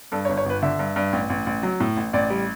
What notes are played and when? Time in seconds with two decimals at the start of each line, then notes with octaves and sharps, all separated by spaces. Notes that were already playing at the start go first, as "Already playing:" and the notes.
0.12 G2 A4
0.25 C#5
0.29 G1
0.37 C#5
0.46 G1 B4
0.62 D3 E5
0.79 G2
0.96 G2
1.13 A1
1.30 A1
1.46 A1
1.63 F#3
1.80 A2
1.97 A1
2.13 A1 D5
2.30 G3